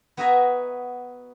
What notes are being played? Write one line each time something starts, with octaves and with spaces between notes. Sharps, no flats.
B3 F#4 D#5 E5 G#5 A#5